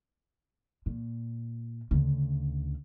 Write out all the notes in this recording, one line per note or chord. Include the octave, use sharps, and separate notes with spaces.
A#2
D2 C#3